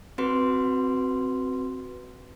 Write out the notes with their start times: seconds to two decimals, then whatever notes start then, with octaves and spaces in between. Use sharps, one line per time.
0.18 C4 F#4 B4 C6